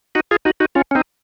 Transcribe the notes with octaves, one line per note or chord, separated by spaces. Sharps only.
D#4 F#4
F4 G#4
D#4 F#4
D#4 F#4
C#4 F4
C#4
C4 D#4